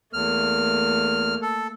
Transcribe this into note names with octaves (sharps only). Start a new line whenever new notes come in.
E2 A3 A#3 F6
A4